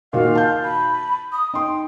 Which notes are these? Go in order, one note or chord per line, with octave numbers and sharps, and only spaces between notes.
A#2 D#3 F#4 F5
A5 G6
B5
D#6
D#4 G5 C6